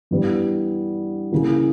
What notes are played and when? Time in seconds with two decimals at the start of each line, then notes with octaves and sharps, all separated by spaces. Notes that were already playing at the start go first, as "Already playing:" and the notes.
0.11 G2 E3 G3 B3
1.32 C#3 E3 A#3